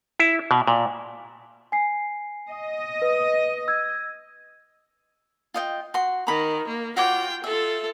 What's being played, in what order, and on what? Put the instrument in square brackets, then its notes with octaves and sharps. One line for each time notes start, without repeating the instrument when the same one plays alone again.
[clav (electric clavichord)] E4
B2
A#2
[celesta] G#5 C7
[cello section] D#5
[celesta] B4
E6 G#6
[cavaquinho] F4 D#5 G5
F#4 C6
[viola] D#3 [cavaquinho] A#5 B5
[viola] A#3
[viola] F4 G5 [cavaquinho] F#4 C#5 D6
[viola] F4 A4 [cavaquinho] E5